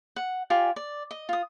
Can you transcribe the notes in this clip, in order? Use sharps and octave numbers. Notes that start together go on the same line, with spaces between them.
F#5
F4 G4 D5 G#5
D5
D#5
F4 D#6